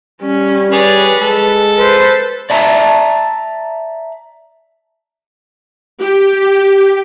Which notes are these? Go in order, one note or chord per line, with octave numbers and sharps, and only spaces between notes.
G3 C#4
G#4 B4 C#5 D5
G#3 A4
B4 C5
D5 E5 A5 A#5
G4